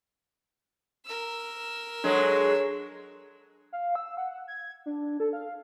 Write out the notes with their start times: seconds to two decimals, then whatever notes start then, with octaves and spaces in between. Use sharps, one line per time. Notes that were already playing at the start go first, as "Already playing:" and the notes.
1.06 A#4 E6
2.04 F#3 G#3 D4 A4 C#5
3.73 F5
3.95 E6
4.17 F#5
4.48 G#6
4.86 D4
5.20 A4
5.33 F5